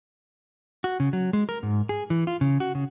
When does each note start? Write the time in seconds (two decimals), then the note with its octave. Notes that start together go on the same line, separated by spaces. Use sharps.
0.84 F#4
1.00 C#3
1.13 F#3
1.33 G#3
1.49 A#4
1.63 G#2
1.89 G#4
2.10 E3
2.27 F4
2.41 C#3
2.60 F#4
2.75 C#3